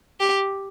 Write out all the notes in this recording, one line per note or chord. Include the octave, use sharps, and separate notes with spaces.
G4